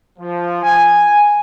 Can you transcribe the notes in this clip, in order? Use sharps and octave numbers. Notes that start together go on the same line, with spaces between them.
F3
G#5